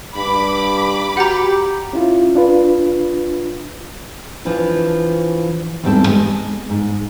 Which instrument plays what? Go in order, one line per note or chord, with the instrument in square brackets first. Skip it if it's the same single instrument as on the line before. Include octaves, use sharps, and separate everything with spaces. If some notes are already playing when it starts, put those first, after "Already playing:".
[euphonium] G2 [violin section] B5 D6
[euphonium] F#4 [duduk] G4 [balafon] F#5 A#5
[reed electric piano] C#4 E4 F4
D4 F4 B4
[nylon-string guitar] E3 F3 D4
E2 G#2 G3 C4 A4 A5
G#3
G#2